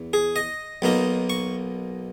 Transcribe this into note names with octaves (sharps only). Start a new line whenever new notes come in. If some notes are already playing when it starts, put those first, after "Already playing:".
Already playing: E2
G#4
D#5
B1 B2 A#3 D#4
C#6